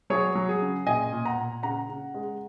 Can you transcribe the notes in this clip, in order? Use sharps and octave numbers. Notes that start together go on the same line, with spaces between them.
F#3 G#4 C#5
F#3
G#4
C#3
A#2 D#5 G#5
A#2
F#5 A#5
A#2
C#3 F#5 A#5
C#3
G#3